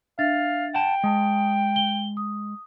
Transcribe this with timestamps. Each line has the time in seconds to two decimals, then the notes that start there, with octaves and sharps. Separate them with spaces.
0.19 D4 E5 F5 A6
0.75 F#5 G5 A5
1.04 G#3 A5 D#6
1.76 G7
2.17 D#6